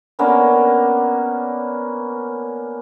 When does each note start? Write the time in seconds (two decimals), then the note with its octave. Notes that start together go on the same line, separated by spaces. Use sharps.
0.19 A#3 B3 C#4 D4